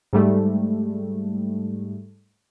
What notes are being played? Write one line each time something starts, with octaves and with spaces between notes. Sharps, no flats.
G#2 G3 A3